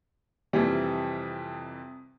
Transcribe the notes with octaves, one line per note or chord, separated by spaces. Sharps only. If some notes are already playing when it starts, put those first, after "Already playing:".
F2 C3 E3 G3